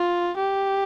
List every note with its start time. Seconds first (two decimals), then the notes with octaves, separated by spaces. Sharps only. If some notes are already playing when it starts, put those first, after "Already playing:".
Already playing: F4
0.37 G4